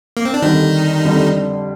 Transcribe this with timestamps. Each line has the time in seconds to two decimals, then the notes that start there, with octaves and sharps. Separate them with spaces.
0.17 A#3
0.25 C4
0.34 D4
0.42 F2 D3 D#3 G3 D#4
1.03 F2 D3 G3